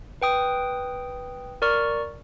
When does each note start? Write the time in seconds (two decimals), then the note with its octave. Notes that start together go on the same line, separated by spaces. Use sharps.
0.22 B4 G5 D#6
1.62 A#4 D5 C#6 F6